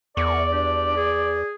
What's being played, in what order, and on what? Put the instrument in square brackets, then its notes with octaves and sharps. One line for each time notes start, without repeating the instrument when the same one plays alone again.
[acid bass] E2 [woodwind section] A#4 C#6 [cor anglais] D5
[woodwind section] D4 G4
G#4